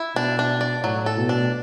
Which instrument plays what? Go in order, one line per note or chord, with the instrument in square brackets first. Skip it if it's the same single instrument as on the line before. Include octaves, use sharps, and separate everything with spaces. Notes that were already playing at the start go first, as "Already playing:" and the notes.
Already playing: [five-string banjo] E4
[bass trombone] B2 [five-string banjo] D4
[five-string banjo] D4
D5
[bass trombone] A2 [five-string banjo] F#3
[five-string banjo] A4
[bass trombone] B2
[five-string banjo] D4